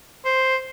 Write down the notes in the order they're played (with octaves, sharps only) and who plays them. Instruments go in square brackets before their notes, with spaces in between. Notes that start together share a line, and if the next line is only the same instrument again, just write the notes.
[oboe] C5